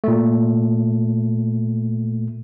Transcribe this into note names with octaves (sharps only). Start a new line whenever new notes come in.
A#2 A3